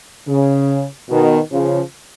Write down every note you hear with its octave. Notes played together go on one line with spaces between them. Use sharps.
C#3
B2 D#3
C#3 F3